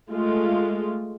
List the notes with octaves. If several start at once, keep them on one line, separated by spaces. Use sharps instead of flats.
G#3 A3 F4